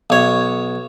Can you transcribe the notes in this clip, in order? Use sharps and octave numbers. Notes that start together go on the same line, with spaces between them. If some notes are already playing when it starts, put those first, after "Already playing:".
B1 C#5